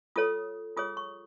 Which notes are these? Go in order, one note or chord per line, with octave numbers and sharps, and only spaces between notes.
F4 A4 C#5 D#6
F4 G#4 C#5 D#6
C#6